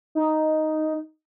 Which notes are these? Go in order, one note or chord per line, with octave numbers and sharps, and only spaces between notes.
D#4